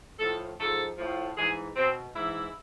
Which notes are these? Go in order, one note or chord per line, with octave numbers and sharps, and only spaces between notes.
A2 F3 A4
G#2 F3 A4
A2 F3
G#2 E3 G#4
B2 C4
G#2 E3 E4